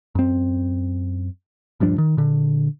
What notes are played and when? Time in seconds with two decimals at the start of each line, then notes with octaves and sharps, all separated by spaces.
0.15 F#2 C4
1.80 D#1 G2 F3 D4
1.98 D#3
2.17 A#2 D3